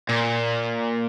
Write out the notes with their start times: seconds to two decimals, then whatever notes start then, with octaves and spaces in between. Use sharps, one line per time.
0.09 A#2